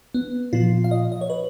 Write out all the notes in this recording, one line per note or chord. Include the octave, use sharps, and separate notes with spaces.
B3
A#2 F3 F4
F5
D#5
D#5
C#5
B4